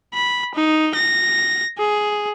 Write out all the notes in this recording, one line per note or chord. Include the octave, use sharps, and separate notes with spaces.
B5
D#4
A#6
G#4